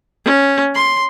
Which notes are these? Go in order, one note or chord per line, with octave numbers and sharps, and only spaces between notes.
C#4
C6